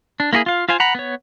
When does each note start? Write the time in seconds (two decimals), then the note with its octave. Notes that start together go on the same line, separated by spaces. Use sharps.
0.20 D4
0.33 A#3 E4 F#4 G#4
0.46 F4 F5
0.69 F4 C5 F5 G#5
0.80 F#5 A#5 B5
0.95 B3 C#5